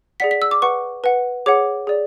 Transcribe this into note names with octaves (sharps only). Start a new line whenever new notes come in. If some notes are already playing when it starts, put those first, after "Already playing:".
G#4 D5 F#5 B6
B6
E6
D6
B4 F#5 C#6
B4 F#5
G#4 C#5 F#5 D6
G#4 D5